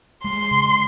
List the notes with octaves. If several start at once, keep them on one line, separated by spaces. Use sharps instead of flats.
G#3 C6
C#3